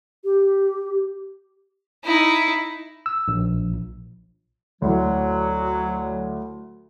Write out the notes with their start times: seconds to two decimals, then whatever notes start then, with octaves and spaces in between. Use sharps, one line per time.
0.24 G4
2.05 D#4 E4
3.06 E6
3.28 A#1
4.82 D2 F#3 E4